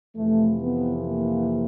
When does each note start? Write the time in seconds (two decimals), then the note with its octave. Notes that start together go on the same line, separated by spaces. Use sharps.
0.17 F2 C3 E3 A3
0.62 B3
1.07 A#3